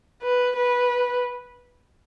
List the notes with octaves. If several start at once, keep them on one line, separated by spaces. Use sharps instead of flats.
B4
B4